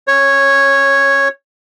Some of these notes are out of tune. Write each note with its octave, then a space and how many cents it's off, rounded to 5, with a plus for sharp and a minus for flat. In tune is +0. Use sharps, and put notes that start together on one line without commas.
C#4 -25 C#5 -5